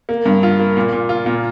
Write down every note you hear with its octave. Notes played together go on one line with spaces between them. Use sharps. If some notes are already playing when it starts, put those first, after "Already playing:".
A#3
G2
F4
A#3
A#2
A#2
F4
A#2